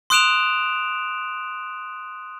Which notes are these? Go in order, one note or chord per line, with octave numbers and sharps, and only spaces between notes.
C6 D#6 F#6 D7 E7 F7